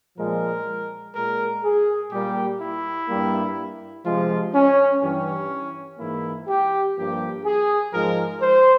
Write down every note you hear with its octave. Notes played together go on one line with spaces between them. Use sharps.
A#2 F3 G#3 A#4
A#2 G#3 A#4
G#4
A#2 G3 A#3 G4
E4
G2 G3 A#3
C3 F3 G#3 F4
C#4
G2 E3 G3 C#4
G#2 E3 A#3 E4
G4
G2 F3 A#3 G4
G#4
G#2 F3 G#3 A#4
C5